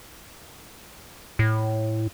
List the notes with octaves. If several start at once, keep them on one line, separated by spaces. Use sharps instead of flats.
A2